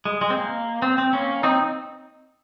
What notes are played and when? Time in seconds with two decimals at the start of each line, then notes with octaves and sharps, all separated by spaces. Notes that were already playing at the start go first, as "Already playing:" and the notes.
0.05 G#3
0.21 G#3
0.30 C4
0.37 A#3
0.82 C4
0.98 C4
1.13 A#3 C#4
1.43 C4 D#4